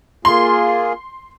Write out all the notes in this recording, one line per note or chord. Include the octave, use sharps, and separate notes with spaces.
A#3 F4 G#4 C6